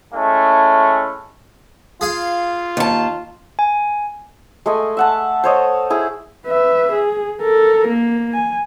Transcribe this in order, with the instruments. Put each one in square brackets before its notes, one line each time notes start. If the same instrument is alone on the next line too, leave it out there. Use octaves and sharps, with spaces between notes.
[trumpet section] G#3 A3 C#4 E4
[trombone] F4 [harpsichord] G#4 F5
[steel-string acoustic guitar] D#2 A5
[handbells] G#5
[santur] G#3 A3 D#5 G#5
E5 F#5 A5
C5 C#5 D#5
E4 G#4
[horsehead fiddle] B4 E5
G#4
A4 A#4
A#3
G#5